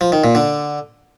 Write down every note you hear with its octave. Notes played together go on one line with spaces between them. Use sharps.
F3
D#3
A#2
D3